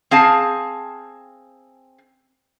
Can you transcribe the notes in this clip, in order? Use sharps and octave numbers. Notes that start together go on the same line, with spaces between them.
C4 G#4 F5 A5